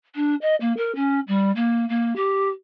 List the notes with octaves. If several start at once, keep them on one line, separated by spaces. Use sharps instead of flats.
D4
D#5
A#3
A#4
C#4
G3
A#3
A#3
G4